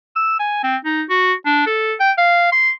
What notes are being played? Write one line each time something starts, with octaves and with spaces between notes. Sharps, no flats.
E6
G#5
C4
D#4
F#4
D4
A4
G5
F5
C6